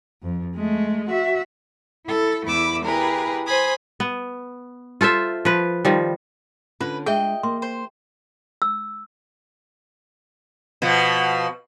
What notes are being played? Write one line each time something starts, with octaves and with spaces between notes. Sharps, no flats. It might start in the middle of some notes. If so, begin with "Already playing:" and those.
F2
G#3 A3
F#4 E5
E4 A4
E2 A3 E4 B5 D6 E6
E4 G4 G#4 A#4 B4
C5 G#5 B5 D#6
B3
F4 A4 C5 E5
F3 B4
D#3 F3 G3
D3 C#4 F4 B4
G#3 D4 G#4 D#5 E5 G5
A#3 C6
C5
E6
B2 F3